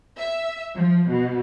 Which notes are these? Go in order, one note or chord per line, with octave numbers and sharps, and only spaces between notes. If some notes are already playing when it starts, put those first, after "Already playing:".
E5
F3
B2